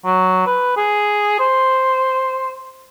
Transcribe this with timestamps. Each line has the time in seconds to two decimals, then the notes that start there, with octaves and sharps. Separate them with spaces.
0.05 F#3
0.46 B4
0.77 G#4
1.39 C5